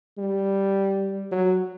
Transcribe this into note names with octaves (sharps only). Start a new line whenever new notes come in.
G3
F#3